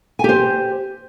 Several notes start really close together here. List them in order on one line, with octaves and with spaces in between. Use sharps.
G#5 G4 C5